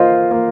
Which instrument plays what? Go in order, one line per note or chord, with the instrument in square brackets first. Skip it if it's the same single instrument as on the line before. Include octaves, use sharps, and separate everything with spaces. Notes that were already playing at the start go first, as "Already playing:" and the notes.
Already playing: [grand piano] A#3 F4 C5 D#5
A#3